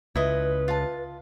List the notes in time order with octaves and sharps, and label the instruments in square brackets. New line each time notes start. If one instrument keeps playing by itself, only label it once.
[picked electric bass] C#2 [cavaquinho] E4 D#5 [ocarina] B4
[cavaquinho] F4 A5